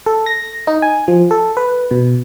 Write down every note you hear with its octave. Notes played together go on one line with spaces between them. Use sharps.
A4
A#6
D#4
G#5
F3
A4
B4
B2